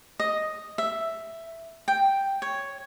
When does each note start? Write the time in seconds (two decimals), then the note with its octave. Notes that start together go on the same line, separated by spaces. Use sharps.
0.20 D#5
0.78 E5
1.88 G5
2.42 C#5